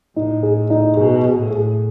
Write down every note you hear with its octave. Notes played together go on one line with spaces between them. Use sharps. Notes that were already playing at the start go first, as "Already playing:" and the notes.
A2 D#4
G#4
D#4
B2 G#4
G#4
A2
G#4